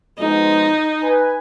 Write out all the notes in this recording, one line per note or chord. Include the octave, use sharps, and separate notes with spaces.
B2 F3 G#3 D#4
B4 G#5